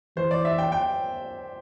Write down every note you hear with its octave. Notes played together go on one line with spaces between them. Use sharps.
E3 C5
D5
E5
G5
G5